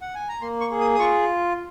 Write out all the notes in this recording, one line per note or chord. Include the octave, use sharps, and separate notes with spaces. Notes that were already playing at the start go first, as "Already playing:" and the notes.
F#5
G#5
A#5
A#3 C6
C#6
G#4
D#6
D#6
F4 C#6